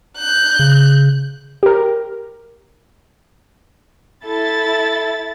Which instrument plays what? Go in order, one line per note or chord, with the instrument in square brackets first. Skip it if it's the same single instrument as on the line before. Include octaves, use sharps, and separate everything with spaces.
[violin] F#6 G6
[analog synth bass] C#3
[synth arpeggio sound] G4 A#4
[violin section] E4 A6 [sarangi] A4